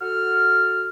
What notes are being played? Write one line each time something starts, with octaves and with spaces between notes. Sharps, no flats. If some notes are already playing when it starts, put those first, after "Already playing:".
F#4 A4 F6